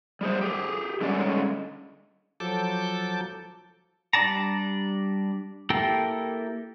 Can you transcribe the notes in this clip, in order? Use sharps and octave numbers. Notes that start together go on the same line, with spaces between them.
G3 G#4 C5
G4 G#4
D3 G3 G#3 C#4 D5
F3 F#3 A4 A5 D6 G6
G3 D4 D5 A5 A#5
A#3 E4 G4 A4 A#4